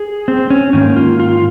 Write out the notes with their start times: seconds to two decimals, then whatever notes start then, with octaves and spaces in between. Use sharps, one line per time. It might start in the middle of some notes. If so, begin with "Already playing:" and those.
Already playing: G#4
0.28 C4
0.50 C#4
0.73 G#2 D#3 A#3 C#4
0.96 F4
1.20 F4